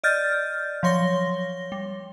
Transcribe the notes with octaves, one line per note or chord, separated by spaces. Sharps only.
D5 D#5 F6 G6 A6
F3 F#3 C#5 C6 A#6 G7
G3